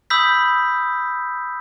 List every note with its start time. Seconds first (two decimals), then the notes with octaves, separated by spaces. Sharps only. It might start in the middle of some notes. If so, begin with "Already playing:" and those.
0.10 B5 D#6 E6 G6 B6